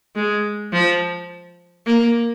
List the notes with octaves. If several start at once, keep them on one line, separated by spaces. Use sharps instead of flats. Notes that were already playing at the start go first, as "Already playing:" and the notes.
G#3
F3
A#3